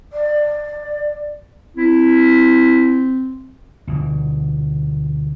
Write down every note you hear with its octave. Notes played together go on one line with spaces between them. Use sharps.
D5
C4 E4
D2 B2 E3